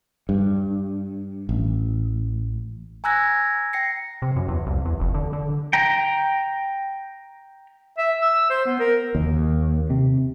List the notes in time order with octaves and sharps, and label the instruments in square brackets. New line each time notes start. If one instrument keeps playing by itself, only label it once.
[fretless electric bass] G2
A1
[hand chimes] G#5 A#5 E6 F#6 G#6 A#6
G5 A#6 C7 C#7
[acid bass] C3
F#2
E2
C2
E2
F1
D3
D3
[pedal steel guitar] G5 A#5
[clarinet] E5
E6
C5
B3
A#4
[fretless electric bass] D#2
C3